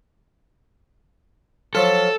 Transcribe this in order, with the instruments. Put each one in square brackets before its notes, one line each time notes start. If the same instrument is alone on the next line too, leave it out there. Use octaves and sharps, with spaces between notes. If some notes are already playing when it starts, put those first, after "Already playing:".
[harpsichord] F3 F#3 F4 [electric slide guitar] A4